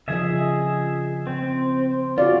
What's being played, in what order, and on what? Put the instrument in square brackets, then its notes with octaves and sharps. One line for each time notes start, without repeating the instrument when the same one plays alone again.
[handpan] C#3 F3 D#5 [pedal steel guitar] G#4 E5
[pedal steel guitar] C4
[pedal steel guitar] F4 [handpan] F#4 G#4 D5